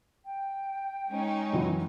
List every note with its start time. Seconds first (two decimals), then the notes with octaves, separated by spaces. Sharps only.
0.25 G5
1.09 G#3 C#4 D#4
1.53 F#2 E3 F#3